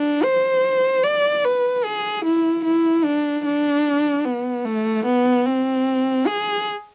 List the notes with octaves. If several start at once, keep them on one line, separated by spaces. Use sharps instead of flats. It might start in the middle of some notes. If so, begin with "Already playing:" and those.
Already playing: D4
C5
D5
B4
G#4
E4
E4
D4
D4
B3
A3
B3
C4
G#4